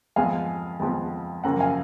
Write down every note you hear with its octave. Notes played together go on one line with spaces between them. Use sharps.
F2 F3 G#3 B3 F5 G#5
F2 F3 G#3 B3
F#2 C#3 F3 A#3 F#5 A#5
F5 G#5